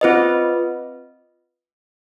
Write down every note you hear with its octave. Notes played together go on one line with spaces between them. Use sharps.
C4 F4 B4 D#5